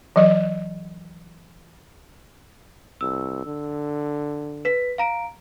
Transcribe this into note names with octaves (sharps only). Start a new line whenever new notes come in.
E3 F#3 D#5
C2 E6
D3
B4 B6
F5 A#5 D7